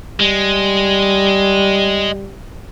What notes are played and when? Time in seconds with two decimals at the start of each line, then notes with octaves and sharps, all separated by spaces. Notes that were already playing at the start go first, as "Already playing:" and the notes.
0.20 G3 G#3